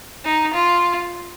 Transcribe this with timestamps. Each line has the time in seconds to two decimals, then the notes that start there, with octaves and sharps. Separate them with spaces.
0.25 D#4
0.54 F4